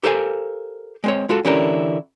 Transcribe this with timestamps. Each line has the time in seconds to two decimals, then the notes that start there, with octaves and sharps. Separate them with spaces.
0.03 G4 A4 A#4 C5 F5 G#5
1.04 G#3 C4 C#5
1.29 G#3 F4 F#4 A4
1.45 D3 E3 C#4 E4 G4 A#4